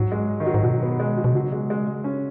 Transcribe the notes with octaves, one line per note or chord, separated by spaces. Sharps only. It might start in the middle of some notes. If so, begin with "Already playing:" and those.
Already playing: G#2 F#3
G#3
D#3
F#3
G#2
B2 F#3
B3
G#3
F#3
B2
C#3 F#3
G#3
G#3
G#3
C#4